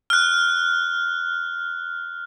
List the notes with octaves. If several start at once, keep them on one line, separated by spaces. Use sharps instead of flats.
F6 F#6